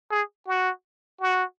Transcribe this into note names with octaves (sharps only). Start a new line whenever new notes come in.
G#4
F#4
F#4